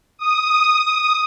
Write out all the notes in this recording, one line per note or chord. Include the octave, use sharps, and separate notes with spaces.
D#6